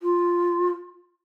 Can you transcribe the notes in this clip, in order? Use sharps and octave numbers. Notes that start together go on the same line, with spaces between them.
F4